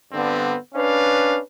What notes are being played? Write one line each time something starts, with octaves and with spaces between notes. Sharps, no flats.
G2 D3 B3 C4
C#4 D4 B4 F5